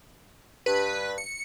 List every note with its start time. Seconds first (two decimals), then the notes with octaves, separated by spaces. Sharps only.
0.66 G2 B4
1.18 C#7